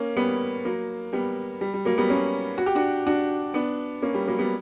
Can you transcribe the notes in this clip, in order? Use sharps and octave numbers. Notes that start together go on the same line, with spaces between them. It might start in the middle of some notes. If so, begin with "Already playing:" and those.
Already playing: A#3 C#4
G3 B3
F#3 A#3
G3 B3
G3
G3
F#3 A#3
G3 B3
A#3 C#4
F#4
G4
D4 F#4
D4 F#4
B3 D4
A#3 C#4
G3
F#3 A#3
G3 B3